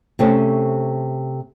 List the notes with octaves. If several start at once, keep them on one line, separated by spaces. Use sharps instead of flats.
C3 A3 C4 C#4 A4